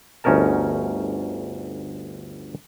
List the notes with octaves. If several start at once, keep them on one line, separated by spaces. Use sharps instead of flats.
G1 D2 C#4 D#4 A#4 A5